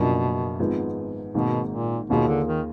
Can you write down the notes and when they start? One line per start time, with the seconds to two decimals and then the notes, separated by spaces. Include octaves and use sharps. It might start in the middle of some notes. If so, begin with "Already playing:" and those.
Already playing: F#1 F#2 B2 F3 A#3 D4
0.59 G#1 G#2 F3 B3
1.34 G#1 G#2 B2 D#3 A#3
1.72 A#2
2.10 D#2 B2 D#3 A#3 F4 G#4
2.28 D3
2.48 D#3